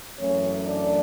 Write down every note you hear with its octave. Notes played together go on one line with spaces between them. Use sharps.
F#2 E3 A3 C#4 C#5
D4 D5